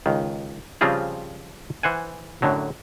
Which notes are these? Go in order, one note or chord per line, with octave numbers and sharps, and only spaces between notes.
C#2 D#3
C#3 F3 G3 C4 F4 G#4
E3 C5 F#5 G#5
F#2 A2 D3 F#3